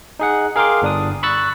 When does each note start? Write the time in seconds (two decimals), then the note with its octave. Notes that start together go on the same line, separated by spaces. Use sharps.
0.19 D#4 G#4 F#5
0.56 G#4 A#4 F5 G5 C6 D6
0.82 G1 D4 D#6
1.23 B5 C#6 E6 F#6 A6 B6